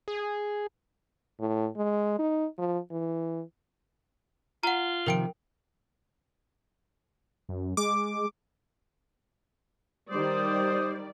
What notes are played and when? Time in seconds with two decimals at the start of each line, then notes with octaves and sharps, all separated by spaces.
0.08 G#4
1.40 A2
1.77 G#3
2.19 D#4
2.58 F3
2.91 E3
4.63 F4 F#5 A#5
5.06 C3 D#3 F3 A#4 G5 D7
7.49 F#2
7.77 G#3 D6
10.11 D#3 G3 C5 D5 D#6